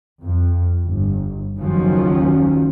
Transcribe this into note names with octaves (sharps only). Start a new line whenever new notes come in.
F2
G1
F#1 D#2 D#3 F3 F#3 C#4